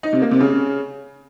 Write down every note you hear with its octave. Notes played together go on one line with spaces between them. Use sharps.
D#4
C3
A#3
C3
C#3